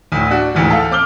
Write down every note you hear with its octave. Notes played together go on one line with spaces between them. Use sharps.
D2 A2
D4 F#4
A1 D2 G#2 E3
A4 F5
C4 D6 F6 G7